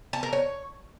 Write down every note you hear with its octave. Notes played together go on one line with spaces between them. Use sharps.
A5
A#4
C#5